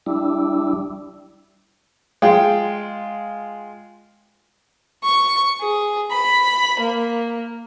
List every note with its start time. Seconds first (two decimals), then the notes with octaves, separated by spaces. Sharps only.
0.06 G3 D4 E4
2.22 G#3 F4 G5
5.04 C#6
5.61 G#4
6.11 B5
6.79 A#3